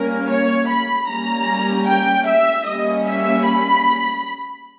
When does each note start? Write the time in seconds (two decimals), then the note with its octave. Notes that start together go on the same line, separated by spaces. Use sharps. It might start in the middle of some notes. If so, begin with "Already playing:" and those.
Already playing: G3 A#3 C#4 A#4
0.30 C#5
0.70 B5
1.09 G3 A#3 C#4 A#5
1.88 G5
2.28 E5
2.67 G3 A#3 C#4 D#5
3.07 E5
3.47 B5